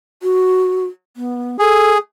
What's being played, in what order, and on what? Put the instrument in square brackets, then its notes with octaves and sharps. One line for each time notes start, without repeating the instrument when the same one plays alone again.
[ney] F#4
B3
[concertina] G#4 [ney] A4